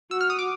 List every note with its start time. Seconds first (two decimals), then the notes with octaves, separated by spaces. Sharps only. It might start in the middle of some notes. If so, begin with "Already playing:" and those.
0.11 F#4 E6
0.21 F6
0.30 D#6
0.39 D6